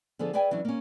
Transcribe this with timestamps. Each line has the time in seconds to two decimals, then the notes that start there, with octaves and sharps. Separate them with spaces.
0.19 D3 F3 B3 G#4 A4
0.33 G#4 B4 D5 E5 G5 G#5
0.51 E3 F#3 C#4 D4
0.65 A#3 C#4